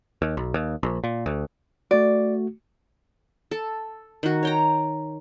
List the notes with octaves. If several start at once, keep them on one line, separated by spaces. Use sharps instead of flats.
D#2
B1
D#2
A#1
A#2
D2
A3 F#4 D5
A4
D#3 F#4
C#5 G5 A#5